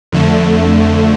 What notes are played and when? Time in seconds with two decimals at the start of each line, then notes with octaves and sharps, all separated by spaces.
0.12 F2 D3 A3